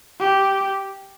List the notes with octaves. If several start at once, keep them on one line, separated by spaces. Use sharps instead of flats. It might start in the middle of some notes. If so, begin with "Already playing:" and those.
G4